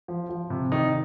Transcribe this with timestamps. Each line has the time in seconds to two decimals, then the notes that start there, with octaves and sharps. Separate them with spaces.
0.08 F3
0.29 F3
0.50 C3
0.72 D#3 D#4